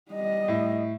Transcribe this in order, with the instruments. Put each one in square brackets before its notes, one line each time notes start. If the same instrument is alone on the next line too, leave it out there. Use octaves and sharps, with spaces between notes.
[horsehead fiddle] G3 D#5
[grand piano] A2